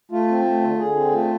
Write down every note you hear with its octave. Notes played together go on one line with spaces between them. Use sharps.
A3 F4
C4
A3
D3
D3 G#4
C4
A3 F4